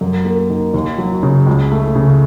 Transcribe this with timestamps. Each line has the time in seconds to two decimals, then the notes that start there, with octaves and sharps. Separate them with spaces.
0.01 F#2
0.25 A#3
0.50 D#3
0.74 D#2
0.98 F#3
1.23 C#3
1.47 C#2
1.72 A3
1.95 C#3